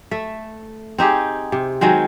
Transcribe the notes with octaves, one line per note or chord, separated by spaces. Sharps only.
A3 E5
C4 D#4 G4 G#4
C3
D#3 F#3 G#3 C4